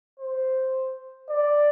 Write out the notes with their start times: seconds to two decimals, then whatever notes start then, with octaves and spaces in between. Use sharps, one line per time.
0.19 C5
1.30 D5